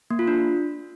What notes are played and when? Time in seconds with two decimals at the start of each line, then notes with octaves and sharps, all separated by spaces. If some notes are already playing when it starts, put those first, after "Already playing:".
0.10 A#3
0.19 F4
0.28 D4